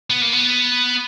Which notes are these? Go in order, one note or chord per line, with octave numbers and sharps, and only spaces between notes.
B3
A#3
B3